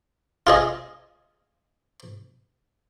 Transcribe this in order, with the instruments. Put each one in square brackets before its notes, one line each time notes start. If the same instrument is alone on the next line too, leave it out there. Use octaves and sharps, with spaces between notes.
[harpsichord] F4 G#4 D#5